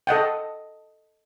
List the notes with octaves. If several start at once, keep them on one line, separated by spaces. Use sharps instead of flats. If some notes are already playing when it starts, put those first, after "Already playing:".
A4 D#5 F#5 G5